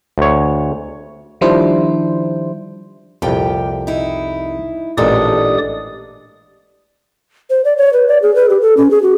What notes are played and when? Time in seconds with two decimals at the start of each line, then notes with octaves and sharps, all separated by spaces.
0.18 D2 C#5
1.41 D#3 F3 G3 D4 E4 C5
3.22 C2 F2 A#2 G4 G5
3.87 D#4 E4
4.98 A1 A#2 G#3 D4 G4 A4 D5 D#6
7.50 C5
7.65 D5
7.77 C#5
7.93 B4
8.08 D5
8.22 G#4
8.35 B4
8.49 G4
8.62 A4
8.77 C#4
8.91 G#4
9.03 F#4